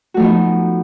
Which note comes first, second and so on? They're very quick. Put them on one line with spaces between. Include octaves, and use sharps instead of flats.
F#4 A3 F3 B3 D#4